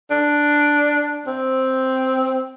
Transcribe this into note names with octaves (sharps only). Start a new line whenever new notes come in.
D4
C4